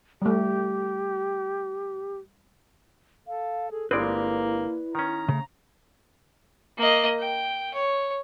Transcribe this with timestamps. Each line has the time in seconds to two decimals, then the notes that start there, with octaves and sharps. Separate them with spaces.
0.22 G3 A3 G4
3.27 A4 F5
3.71 G#4 A4
3.91 G1 G#3 A#3 C4 E4 B4 D5
4.95 D#3 C#4 A#5
5.29 C#3 A3
6.77 A#3 D#5
7.19 G5
7.74 C#5